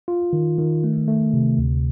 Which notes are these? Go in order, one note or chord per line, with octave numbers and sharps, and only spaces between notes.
F4
D#3
D#3
A3
A3
C3
D2